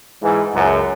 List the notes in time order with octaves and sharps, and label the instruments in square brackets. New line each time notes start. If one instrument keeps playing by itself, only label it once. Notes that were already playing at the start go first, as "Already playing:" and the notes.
[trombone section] G#2 E3
C#2 F#2